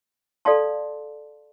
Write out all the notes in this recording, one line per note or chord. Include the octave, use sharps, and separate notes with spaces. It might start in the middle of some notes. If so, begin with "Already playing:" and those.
A4 D5 F5 A5 C6